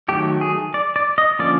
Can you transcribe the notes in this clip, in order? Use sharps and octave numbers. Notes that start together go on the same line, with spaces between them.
D#3 F#3 A3 G4
G#4
D5
D5
D#5
D3 F3 A#3 C#4 D5